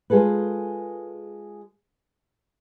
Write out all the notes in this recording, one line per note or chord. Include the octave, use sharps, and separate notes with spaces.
G#3 F4 G#4 A4 B4